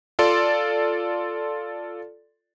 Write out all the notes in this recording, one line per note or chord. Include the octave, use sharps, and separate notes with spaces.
F4 A4 D5 C6